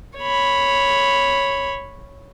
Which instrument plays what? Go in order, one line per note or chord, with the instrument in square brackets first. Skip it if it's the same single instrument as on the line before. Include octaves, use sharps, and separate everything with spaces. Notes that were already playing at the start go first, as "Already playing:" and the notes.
[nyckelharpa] C#5 B5